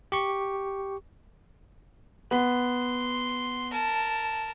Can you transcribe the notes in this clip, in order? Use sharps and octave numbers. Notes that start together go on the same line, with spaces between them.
G4 C#6
B3 C6
A#4 A5